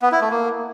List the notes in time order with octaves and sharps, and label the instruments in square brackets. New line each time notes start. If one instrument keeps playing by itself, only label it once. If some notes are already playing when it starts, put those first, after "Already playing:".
[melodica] B3
E4
A3
A#3